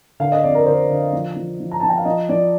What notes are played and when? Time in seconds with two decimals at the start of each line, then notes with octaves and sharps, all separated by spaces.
0.20 D3 F5
0.32 D#5
0.43 F2 D5
0.55 A#4
0.66 D3 C5
0.90 D3
1.13 F3
1.36 F3
1.60 F3
1.71 A#5
1.80 F3 A5
1.89 G5
1.98 F5
2.05 F3 D#5
2.29 F3 D5